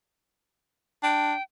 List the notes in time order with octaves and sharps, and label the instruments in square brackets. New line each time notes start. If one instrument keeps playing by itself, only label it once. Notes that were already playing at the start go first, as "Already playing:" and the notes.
[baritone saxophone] D4 [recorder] G5